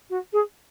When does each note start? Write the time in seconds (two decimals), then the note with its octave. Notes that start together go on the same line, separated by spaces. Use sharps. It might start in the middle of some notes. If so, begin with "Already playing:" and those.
0.09 F#4
0.32 G#4